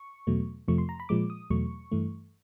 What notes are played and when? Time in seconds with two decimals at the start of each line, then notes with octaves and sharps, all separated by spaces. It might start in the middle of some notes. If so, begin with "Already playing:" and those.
Already playing: C#6
0.27 E2 B2 F#3 A3
0.68 F2 C3 F3 A3 C#6
0.78 C6
0.89 A#5
1.00 B5
1.09 A#2 F3 G#3 D6
1.30 D#6
1.50 E2 B2 F#3 A3 C#6
1.92 G2 E3 A3